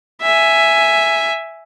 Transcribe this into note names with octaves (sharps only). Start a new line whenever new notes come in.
E5 G#5